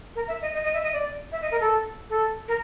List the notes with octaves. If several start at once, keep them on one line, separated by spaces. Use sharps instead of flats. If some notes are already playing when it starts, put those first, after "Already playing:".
A#4
E5
D#5
D#5
D#5
E5
D#5
D5
E5
D#5
A#4
A4
A4
A#4